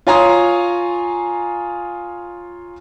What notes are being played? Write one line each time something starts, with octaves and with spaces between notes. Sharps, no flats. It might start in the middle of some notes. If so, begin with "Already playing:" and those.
F4 C#5 G#5 A#5 C6 D#6